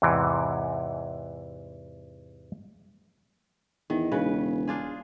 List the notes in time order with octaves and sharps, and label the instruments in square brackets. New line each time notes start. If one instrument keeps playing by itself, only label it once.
[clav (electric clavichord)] E2 G#2 C3 E3
[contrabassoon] E2 [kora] D#3
[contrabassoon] E1 [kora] C#3 B4
[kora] D4 F4 G#4